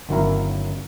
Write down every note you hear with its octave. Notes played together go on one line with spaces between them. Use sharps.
G1 D#3 F#3 C#4 E4 A#4